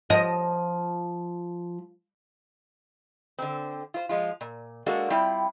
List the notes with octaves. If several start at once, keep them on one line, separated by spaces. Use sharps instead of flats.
F3 D#5
D3 C4
F4 C5
F3 G#3 F4
A#2
G#3 A#3 D4 F#4 A4
G3 C4 E4 F4 G5